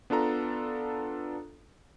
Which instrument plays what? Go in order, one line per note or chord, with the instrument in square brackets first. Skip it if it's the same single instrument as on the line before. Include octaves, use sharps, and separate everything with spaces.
[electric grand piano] B3 D4 F4 A4 A#5